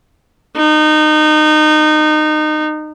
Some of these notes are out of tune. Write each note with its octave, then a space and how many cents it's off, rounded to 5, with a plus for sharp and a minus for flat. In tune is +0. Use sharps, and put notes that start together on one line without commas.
D#4 -25